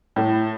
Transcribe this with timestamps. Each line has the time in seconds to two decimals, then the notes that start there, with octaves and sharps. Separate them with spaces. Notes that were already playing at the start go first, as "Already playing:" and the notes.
0.16 A2